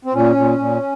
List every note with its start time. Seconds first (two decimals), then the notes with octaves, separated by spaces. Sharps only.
0.05 C4
0.14 A#2 C#4
0.36 A#2
0.58 A#2